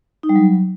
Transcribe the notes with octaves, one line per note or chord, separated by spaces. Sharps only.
D#4
G3
F#3